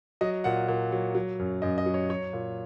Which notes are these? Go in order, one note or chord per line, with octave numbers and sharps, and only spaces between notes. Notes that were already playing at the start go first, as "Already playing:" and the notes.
F#3 D#5
A#2 F#5
A#2
F#3
F#3
F#2
F#2 D#5
D#5
F#3
C#5
F#3 C#5
A#2